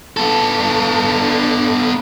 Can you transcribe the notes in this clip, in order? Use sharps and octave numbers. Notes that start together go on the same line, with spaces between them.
B3 A4